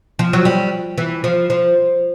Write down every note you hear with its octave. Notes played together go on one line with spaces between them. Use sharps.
F3
F#3
G3
E3
F3
F3